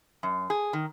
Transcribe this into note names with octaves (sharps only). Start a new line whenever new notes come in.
F#2
G#4
D#3